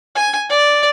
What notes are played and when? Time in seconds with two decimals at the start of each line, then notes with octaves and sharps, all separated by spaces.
0.15 G#5
0.50 D5